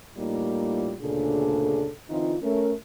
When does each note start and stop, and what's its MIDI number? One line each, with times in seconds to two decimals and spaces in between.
0.18 0.95 45
0.18 0.95 55
0.18 0.95 58
0.18 0.95 63
0.18 0.95 65
1.01 1.90 38
1.01 1.90 46
1.01 1.90 49
1.01 1.90 62
1.01 1.90 68
1.01 1.90 69
2.10 2.36 50
2.10 2.36 52
2.10 2.36 60
2.10 2.36 63
2.10 2.36 65
2.43 2.74 57
2.43 2.74 61
2.43 2.74 70